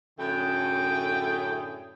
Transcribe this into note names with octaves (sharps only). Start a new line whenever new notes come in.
F#2 A2 D3 A3 G#4 G5